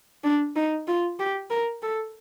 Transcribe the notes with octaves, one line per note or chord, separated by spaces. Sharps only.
D4
D#4
F4
G4
A#4
A4